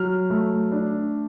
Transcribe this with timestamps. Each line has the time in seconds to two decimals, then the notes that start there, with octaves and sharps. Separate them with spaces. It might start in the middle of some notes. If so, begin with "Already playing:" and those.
Already playing: F#3 F6
0.30 A3
0.72 D4